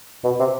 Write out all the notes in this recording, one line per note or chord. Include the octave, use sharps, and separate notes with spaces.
B2
C3